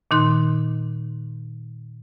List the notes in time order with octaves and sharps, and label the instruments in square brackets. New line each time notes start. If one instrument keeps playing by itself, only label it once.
[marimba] A#2 D#3 D#4 C6 F#6